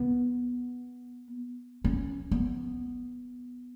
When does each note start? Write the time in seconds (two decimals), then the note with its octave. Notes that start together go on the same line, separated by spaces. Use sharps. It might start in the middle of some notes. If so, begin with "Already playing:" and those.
Already playing: B3
1.84 C#4
2.31 B3